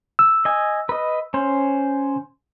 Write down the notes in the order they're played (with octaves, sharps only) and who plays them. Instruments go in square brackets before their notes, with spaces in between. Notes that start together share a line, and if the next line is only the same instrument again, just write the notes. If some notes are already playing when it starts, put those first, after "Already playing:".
[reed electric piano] E6
[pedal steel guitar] D#5 G#5
B4 D#5
C#4 C5